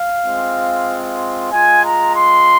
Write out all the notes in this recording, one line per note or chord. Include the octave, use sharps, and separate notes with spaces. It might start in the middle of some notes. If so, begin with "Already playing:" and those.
Already playing: F5
G#3 C4 F4
G#3 F4 G#5
A#5
C6